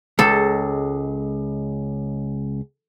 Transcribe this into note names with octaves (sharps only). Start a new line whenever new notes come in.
C#2 G#3 A4